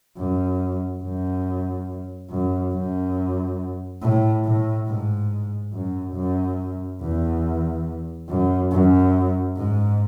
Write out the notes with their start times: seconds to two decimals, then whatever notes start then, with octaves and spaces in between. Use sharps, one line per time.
0.17 F#2
1.02 F#2
2.30 F#2
2.73 F#2
4.01 A2
4.44 A2
4.87 G#2
5.73 F#2
6.14 F#2
7.01 E2
8.29 F#2
8.71 F#2
9.56 G#2